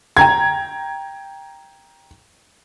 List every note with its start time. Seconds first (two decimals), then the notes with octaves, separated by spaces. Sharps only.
0.17 G5 A#5 G#6